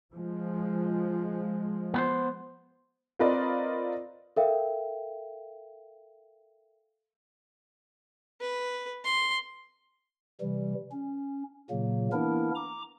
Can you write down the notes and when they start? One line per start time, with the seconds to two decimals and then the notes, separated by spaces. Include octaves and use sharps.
0.13 F3 G#3
1.94 B3 B4 C5
3.19 C4 F4 A#4 B4 D5 D#5
4.37 A4 A#4 E5 F5 G5
8.41 B4
9.05 C6
10.41 C3 E3 G3
10.92 C#4
11.70 A#2 C#3 F#3 A#3
12.12 E3 A#3 B3 D4 E4 A#4
12.55 A#5 D6